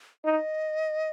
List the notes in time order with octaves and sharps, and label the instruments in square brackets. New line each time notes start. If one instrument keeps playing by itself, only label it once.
[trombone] D#4 [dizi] D#5